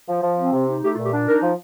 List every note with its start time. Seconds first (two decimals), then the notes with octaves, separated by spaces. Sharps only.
0.08 F3
0.23 F3
0.37 C4
0.53 C3
0.68 D#4
0.83 A3 G4
0.94 F4
0.98 A#2
1.05 G4
1.13 D4
1.28 D#4 A#4
1.43 F3